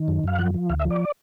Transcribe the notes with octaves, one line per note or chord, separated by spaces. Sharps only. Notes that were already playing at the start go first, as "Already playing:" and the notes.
Already playing: D#3
F#2
F#2 F5
F3 F#5
F3
D2 F5
E5
F3
D5